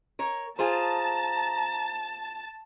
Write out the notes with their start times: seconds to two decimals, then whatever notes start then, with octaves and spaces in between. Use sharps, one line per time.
0.19 A#4 C#5
0.59 F4 G#4 C5 A5 A#5